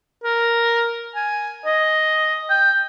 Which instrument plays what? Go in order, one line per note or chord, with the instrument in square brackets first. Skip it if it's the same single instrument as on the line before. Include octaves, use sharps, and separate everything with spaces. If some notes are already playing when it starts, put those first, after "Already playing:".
[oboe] A#4
G#5
D#5
G5